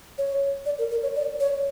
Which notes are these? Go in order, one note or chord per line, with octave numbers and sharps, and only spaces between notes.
C#5
D5
A#4
A#4
C#5
D5
C#5